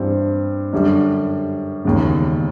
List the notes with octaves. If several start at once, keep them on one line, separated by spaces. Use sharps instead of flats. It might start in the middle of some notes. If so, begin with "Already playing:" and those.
Already playing: G2 E3 G3 C4
F#2 D3 G3
E1 D#2 C#3